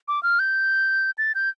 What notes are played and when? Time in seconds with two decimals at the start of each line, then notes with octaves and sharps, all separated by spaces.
0.08 D6
0.23 F6
0.39 G6
1.18 A6
1.35 G6